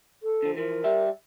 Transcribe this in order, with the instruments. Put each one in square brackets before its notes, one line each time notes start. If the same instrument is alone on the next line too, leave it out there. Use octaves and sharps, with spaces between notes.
[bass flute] A4
[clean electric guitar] D3 F3
[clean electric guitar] E3 F3 [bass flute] A#4
[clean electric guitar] G3 E5